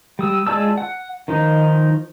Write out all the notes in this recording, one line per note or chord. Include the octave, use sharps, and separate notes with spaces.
G3 D#6 E6
G#3 F4 D5 A5 E6
F#5
D#3 F3 D#4